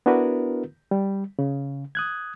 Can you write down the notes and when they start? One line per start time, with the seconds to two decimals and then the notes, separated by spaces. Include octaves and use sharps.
0.06 B3 D4 E4 F#4 A#4 B4
0.91 G3
1.39 C#3
1.95 D#6 F#6 G#6